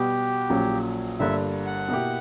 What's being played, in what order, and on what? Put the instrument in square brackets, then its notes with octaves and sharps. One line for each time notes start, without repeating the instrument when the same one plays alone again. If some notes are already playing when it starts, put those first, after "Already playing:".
Already playing: [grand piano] B2 G3 B3 F#4 [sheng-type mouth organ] G4
[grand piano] A#1 A#2 F#3 C#4
[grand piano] G1 G2 D3 A#3 [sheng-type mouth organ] E5
[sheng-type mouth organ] F#5
[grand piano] B2 A#3 E4 G4